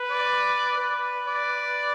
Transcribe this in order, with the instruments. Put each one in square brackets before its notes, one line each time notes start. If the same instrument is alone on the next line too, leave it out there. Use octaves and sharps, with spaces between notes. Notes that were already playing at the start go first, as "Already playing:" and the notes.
Already playing: [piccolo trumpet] B4
[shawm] D5
[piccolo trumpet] B4
[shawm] D5